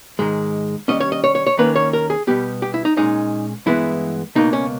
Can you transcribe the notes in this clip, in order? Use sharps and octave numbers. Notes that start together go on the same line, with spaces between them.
G#2 D#3 G#3
D#2 D#3 G3 C#4 D#5
C#5
D#5
C#5
C#5
C#5
D#2 D#3 A#3 C#4 B4
C#5
A#4
G#4
B2 G3 B3 G4
G4
E4
D#4
A#2 G#3 C#4 D#4
G2 E3 G#3 B3 E4
C#2 B2 A#3 D#4
C#4